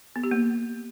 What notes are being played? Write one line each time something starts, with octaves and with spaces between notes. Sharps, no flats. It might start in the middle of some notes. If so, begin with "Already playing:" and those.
B3
G4
A#3